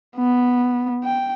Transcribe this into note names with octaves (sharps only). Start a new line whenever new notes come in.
B3
G5